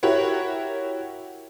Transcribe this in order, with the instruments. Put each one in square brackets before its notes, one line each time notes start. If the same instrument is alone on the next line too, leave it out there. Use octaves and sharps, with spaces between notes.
[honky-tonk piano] E4 F#4 G4 A#4 C#5 F#5